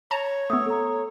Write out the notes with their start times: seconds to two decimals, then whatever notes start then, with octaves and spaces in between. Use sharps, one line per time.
0.11 C#5 A5 A#5
0.50 A3 B3 D#6 E6
0.66 A4 A#5